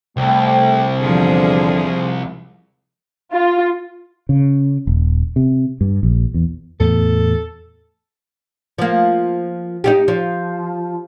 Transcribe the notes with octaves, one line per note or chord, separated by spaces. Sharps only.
C2 A3 G5
E2 D3 F3 G#4
F4
C#3
D#1
C3
G2
A#1
E2
E2 A2 B3 A4
F3 A#3
D#4 F4 G4
F3